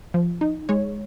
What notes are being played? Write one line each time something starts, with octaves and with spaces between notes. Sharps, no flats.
F3
D#4
G#3 C#5